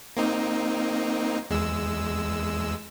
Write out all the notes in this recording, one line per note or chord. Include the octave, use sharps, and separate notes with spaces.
A#3 C4 D#4
E2 G#3 E6